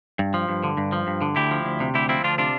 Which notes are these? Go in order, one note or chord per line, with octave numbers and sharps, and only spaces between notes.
G2
F3
G2
D3
G2
F3
G2
D3
D2 E4 G4
F3
D2
C3
D2 E4 G4
F3 C4 E4
D2 D4 F4
C3 D4 F4